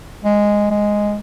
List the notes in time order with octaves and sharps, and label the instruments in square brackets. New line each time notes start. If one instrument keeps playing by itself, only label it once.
[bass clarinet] G#3
G#3